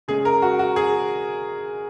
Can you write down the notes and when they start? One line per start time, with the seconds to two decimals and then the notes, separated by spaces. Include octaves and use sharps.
0.08 C#3 G#3 G#4
0.25 A#4
0.42 F#4
0.59 F#4
0.76 G#4